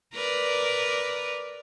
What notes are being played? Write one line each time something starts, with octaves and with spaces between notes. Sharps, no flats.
A#4 B4 D5